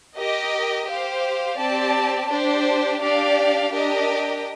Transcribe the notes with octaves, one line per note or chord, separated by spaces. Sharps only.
G4 A#4 D#5
G4 C5 F5
C4 G4 D5 A5
D4 G4 C5
D4 G4 D5 F5
D4 G4 A#4 D#5